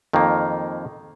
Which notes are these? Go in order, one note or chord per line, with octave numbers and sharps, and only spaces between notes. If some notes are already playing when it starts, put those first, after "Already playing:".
F2 D#3 A#3